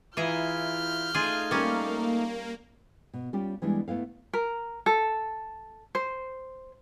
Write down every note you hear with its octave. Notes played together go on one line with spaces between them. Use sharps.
E3 E4 F4 G#4 A#5 F6 G6
A3 D#4 F4 G#4 F5
G3 A#3 C#4
B2
G3 C#4 F4 G4
E3 G3 G#3 B3 D4 E4
A3 B3 E4 F5
A#4
A4
C5